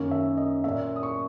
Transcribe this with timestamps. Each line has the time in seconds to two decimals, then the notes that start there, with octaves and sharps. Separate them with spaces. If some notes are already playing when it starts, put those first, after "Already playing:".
Already playing: F#2 D#3 A#3 C#4
0.11 E5
0.37 D#5
0.64 A#2 A#3 C#4 E5
0.96 D#6
1.03 C#6